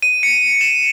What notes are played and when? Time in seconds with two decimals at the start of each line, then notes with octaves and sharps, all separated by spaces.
0.02 D#7
0.23 C#7
0.61 E7